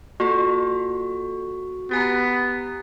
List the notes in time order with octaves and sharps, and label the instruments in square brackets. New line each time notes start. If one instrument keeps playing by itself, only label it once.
[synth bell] A#3 F4 A4 [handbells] F#4
[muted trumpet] B3 [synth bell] G4 G#5 A#5